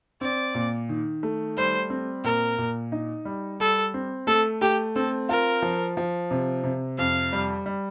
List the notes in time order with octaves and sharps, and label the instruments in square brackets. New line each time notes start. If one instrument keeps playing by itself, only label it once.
[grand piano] C4 [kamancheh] D5
[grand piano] A#2
D#3
A3
[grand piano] G3 [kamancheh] C5
[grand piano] C4
[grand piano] A#2 [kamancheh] A#4
[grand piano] A#2
D#4
G3
[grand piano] G3 [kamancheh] A4
[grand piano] C4
[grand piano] A3 [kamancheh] A4
[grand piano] A3 [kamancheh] G4
[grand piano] C4 [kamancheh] A4
[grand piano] F4 [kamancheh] A#4
[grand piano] F3
F3
C3
C3
[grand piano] F2 [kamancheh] F5
[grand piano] G3
G3